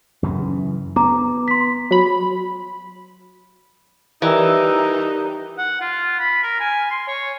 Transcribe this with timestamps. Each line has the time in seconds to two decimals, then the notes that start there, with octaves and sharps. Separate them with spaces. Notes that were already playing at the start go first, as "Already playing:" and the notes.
0.23 F#2 C#3 E3
0.96 B3 A#5 D6
1.48 C6 B6
1.91 F#3 B5
4.22 E3 G3 D#4 A#4 E6
5.58 F#5
5.81 F4
6.19 B5
6.43 A#4
6.60 G#5
6.90 C6
7.08 C#5